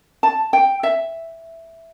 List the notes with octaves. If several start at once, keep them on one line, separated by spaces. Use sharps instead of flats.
A5
G5
E5